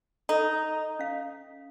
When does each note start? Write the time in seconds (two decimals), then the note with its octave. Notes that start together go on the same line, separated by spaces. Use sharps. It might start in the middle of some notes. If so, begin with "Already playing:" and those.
0.29 D#4 A4
0.99 C#4 F5